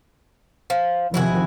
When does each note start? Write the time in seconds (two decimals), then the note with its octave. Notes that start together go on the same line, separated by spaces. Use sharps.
0.70 F3
1.14 C3 D#3 F3 E4 F#4 G#4